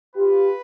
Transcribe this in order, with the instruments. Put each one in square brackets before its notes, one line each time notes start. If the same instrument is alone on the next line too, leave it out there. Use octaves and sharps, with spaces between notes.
[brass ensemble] F4 G4 [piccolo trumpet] B4